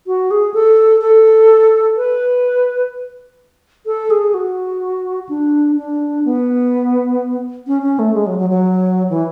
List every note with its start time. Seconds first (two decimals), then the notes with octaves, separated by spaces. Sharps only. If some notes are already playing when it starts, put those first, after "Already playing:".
0.07 F#4
0.31 G#4
0.54 A4
1.01 A4
1.97 B4
3.86 A4
4.10 G#4
4.34 F#4
5.29 D4
5.77 D4
6.25 B3
7.67 C#4
7.82 C#4
7.99 A3
8.14 G#3
8.27 F#3
8.39 F#3
8.50 F#3
9.10 E3